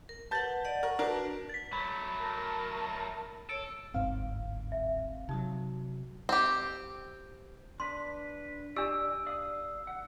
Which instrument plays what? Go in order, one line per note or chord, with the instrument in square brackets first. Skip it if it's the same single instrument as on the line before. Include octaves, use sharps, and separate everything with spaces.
[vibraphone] A#4
[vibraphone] B4 F#5 [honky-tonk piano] A5 G6 A6
[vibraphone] D5 D#5 F#5
[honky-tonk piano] A#4 [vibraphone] F#5 C#6
[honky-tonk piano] D4 A#4 [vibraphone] F#4 B4 A5
[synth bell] A6 B6
[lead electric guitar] F#3 A3 [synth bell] B5
[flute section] A#4 A5
[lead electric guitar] A4 [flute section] C#5 [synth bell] D7
[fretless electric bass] D1 G#2 [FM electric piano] G1 C4 F5
[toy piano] E5
[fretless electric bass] C3 F#3 [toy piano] D#4 D#6
[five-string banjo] C4 G4
[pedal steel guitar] D4 B4 [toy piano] C6
[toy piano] D4 G4 [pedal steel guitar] D5 D#5 [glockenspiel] E6
[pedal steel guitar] D5 F5 D#6
F#5